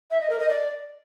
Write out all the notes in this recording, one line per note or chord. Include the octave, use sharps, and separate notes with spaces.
E5
D#5
A#4
D#5
D5